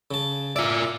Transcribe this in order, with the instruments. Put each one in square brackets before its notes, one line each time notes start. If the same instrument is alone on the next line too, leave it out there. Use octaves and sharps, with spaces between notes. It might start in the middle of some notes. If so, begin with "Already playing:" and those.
[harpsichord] C#3 A5
[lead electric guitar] F4 D5 [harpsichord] E5